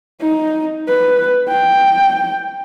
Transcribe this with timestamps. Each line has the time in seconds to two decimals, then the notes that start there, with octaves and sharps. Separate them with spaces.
0.21 D#4
0.88 B4
1.48 G5